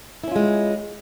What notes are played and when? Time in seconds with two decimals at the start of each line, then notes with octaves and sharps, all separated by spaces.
0.24 E4
0.28 C#4
0.32 F4
0.36 G#3